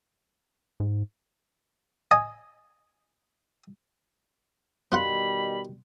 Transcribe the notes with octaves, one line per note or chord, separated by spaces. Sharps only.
G#2
D#5 G#5
B2 D#3 G3 B3 F4 F#5 B5